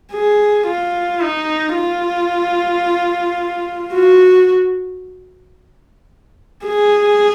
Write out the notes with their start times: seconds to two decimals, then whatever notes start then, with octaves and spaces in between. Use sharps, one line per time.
0.12 G#4
0.67 F4
1.22 D#4
1.76 F4
3.94 F#4
6.66 G#4